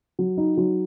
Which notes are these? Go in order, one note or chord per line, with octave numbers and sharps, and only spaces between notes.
F#3
D#4
F#3